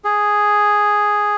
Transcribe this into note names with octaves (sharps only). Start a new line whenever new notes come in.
G#4